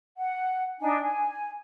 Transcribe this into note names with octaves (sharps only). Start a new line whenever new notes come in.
F#5
D4 D#4 G#5
G#5